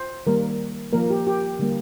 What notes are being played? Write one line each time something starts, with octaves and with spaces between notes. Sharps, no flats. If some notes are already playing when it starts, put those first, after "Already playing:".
Already playing: C5
D#3 G3 A#3 A#4
F3 A#3 A#4
G4
G4
D3 G3 A#3